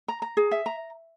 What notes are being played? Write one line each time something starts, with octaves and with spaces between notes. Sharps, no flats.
A#5
A#5
G#4
E5
A#5